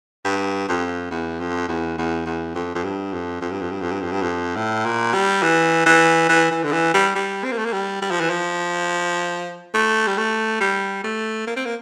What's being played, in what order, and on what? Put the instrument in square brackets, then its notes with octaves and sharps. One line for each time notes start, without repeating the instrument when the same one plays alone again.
[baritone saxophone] G2
F2
E2
F2
E2
E2
E2
F2
F2
G2
F2
F2
G2
F2
G2
F2
G2
F2
G2
F2
A2
A#2
G3
E3
E3
E3
E3
D3
E3
G3
G3
C4
A#3
A3
A#3
G3
G3
F3
E3
F3
A3
G3
A3
G3
A3
A#3
C4
A#3